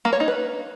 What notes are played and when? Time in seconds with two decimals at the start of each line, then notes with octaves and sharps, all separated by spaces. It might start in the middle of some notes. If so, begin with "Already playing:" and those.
0.05 A#3
0.13 C#5
0.20 D#4
0.28 B4